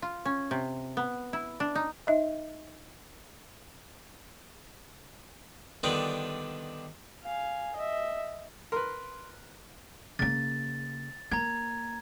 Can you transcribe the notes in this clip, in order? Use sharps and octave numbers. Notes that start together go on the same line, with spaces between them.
F4
C#4
C3
B3
E4
D4
D#4
D#4 D#5 E5
D3 D#3 G3 B3 D#4 F4
F5 G#5
D#5 E5
A#4 B4 C6
C#3 A#3 A6
A#3 A#5 G#6